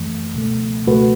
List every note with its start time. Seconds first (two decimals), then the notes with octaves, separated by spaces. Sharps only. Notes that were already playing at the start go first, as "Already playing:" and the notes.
Already playing: F#2 E3 A3
0.34 C#2 B2 A3
0.87 C#2 B2 A3 F#4 B4